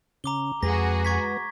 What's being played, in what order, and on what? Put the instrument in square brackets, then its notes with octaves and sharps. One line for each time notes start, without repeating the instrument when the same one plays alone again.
[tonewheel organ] C#3 C#4 [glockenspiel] A#5 D6 G7
[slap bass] F2 [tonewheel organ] G#3 B4 A#5 [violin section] F#4 G#4 [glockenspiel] A#6
[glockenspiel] C#6 G#6 B6